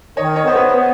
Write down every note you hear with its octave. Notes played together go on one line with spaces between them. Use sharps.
D#3 C#5 D#5
C#5 D#5
B3 C5
B4 C#5
B3